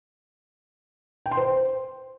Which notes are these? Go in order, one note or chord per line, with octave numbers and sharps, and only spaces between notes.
G5
C6
C5